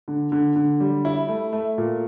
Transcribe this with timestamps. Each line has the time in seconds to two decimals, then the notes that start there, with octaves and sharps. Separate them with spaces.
0.08 D3
0.32 D3
0.56 D3
0.80 G3
1.05 E4
1.29 A3
1.53 A3
1.78 A#2